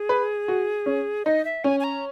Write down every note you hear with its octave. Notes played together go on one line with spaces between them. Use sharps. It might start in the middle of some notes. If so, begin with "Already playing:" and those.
Already playing: G#4
B4
F#4
C#4
D#4 D#5
E5
C#4 G#5
G#5
A#5